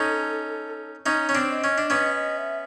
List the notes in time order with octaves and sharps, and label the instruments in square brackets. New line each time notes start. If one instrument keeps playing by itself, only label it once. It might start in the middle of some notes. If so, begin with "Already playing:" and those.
Already playing: [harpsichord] C#4 D#4 [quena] A4
[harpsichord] C#4 D#4 [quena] C#5
[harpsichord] C#4
C4 D4
[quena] D#5
[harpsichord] C#4
D4
[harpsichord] B3 C#4 [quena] D#5
[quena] D#5
E5